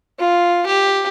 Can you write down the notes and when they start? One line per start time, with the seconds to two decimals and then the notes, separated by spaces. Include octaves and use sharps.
0.19 F4
0.66 G4